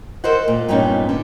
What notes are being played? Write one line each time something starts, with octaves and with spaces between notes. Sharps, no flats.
A4 A#4 C5 D#5 F#5
A#2
G2 A#2 G3 B3 C#4 D#4
D3